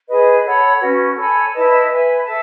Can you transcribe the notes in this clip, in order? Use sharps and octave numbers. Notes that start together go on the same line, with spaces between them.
G#4 B4 D#5
A4 C#5 F#5 B5
C#4 F#4 B4
A4 C#5 G#5 B5
E4 B4 D#5 A5
B4 E5 G#5
A4 E5 A5